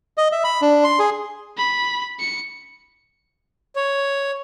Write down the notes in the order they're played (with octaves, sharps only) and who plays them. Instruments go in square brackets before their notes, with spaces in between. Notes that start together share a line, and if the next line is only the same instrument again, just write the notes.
[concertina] D#5
E5
B5
D4
C6
G#4
[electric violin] B5
C#7
[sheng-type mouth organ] C#5